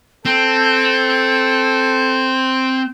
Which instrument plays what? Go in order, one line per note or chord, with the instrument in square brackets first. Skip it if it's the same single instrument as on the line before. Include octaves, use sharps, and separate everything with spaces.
[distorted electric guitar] C4 [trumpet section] A4 [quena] G6